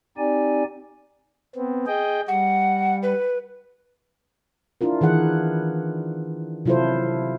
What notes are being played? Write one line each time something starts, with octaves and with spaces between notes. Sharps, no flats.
C4 D#4 G4 D5 G#5
B3 C4
G#4 D#5 G5
G3 F#5
B4
D4 E4 F4 A#4
D#3 E3 G#4 F#5
C3 F#3 E4 F4 A4 C5